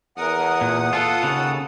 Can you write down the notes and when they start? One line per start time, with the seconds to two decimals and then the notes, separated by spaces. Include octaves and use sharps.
0.17 E2 A#4 F#5 D#6
0.61 A#2
0.93 F4 A4
1.23 D#2 C#3